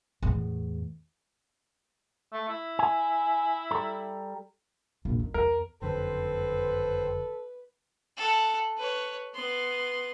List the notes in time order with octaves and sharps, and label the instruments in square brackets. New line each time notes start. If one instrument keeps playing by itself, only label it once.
[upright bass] E2 A2
[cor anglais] A3
E4
[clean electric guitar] G#5
G3 A4 A#5
[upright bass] A#1 E2
D#3
[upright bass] E2 [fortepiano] A#4
[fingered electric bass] F#1 F2 D3 [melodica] C4 C5 [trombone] A4 [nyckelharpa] B4
[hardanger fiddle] A4 F#5
B4 C#5
B3 C6